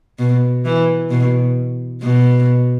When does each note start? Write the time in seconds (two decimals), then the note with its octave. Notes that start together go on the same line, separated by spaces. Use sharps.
0.19 B2
0.65 E3
1.10 B2
2.03 B2